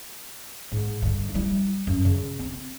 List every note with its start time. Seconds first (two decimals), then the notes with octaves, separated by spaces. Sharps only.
0.72 G#2
1.02 G2 D3
1.34 G3 E4
1.87 F#2
2.05 C#3
2.39 C4